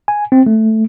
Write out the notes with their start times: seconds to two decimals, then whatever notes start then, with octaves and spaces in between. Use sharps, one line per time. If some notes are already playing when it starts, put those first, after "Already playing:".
0.08 G#5
0.32 C4
0.46 A3